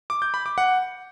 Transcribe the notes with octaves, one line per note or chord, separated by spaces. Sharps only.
D6
G6
B5
D6
F#5